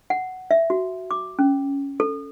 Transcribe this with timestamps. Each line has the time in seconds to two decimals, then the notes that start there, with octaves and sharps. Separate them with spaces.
0.10 F#5
0.51 E5
0.70 F#4
1.11 D6
1.39 C#4
2.00 A4